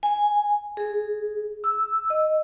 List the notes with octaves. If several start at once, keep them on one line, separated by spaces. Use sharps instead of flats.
G#5
G#4
E6
D#5